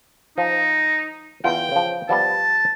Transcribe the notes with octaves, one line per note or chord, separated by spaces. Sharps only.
F3 D#4
E2 F4 G5
C#3 F3
F3 G3 B3 A5